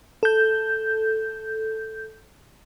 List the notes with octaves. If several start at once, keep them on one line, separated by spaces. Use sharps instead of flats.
A4 G6